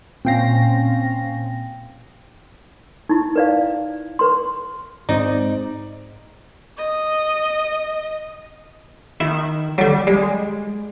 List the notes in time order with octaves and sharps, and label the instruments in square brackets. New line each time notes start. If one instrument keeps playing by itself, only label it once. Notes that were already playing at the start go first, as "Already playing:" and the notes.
[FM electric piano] A#2 G5 A#6 [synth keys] C4 C#4 F5
[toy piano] D#4 E4
B4 D5 F5
B4 C6
[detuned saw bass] G#2 [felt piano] C4 D5 [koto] D#4
[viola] D#5
[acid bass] D#3 [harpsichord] E4
[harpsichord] D3 F#3 [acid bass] G3
[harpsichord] G3 [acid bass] G#3